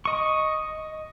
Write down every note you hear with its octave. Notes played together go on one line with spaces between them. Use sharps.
D#5 C#6